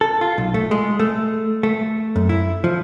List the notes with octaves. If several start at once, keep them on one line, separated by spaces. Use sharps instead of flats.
A4
F4
B1
A3
G#3
A3
A3
F#2
E4
F3